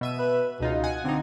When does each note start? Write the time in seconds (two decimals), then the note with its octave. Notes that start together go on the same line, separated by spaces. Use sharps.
0.01 B2 E5 D#7
0.19 B4
0.60 C#2 B2 D#4 F4
0.84 F#5 G#5
1.04 D3 C4 D#4